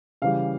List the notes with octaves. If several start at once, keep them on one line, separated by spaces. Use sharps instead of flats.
C#3 E3 G3 F5